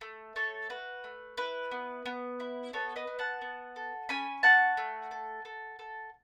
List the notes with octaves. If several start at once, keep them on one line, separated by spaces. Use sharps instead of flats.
A3
A3 A4 C#5
F#4 B4
A3
E4 B4
B3
B3
E4
B3 A4 C#5
B4 D#5
B3
F#5 A5
B3
A4
C#4 G#5 B5
F#4 F#5 A5
A3
A4
A4
A4